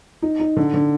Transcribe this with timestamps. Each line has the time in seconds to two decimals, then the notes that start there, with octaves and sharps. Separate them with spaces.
0.22 D#4
0.40 D#4
0.57 D3
0.74 D3